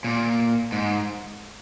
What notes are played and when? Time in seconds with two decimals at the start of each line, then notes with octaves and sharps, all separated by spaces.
0.04 A#2
0.72 G#2